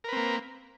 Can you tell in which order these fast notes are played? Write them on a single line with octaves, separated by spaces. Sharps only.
A#4 B4 C4 A#3